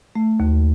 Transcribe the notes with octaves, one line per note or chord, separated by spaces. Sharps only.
A3
D#2